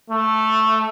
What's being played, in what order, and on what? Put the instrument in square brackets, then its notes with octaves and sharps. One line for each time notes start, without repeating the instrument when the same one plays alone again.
[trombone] A3